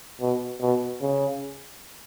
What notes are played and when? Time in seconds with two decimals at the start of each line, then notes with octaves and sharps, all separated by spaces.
0.21 B2
0.61 B2
1.02 C#3